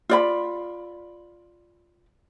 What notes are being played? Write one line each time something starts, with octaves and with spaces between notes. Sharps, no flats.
F4 D5 B5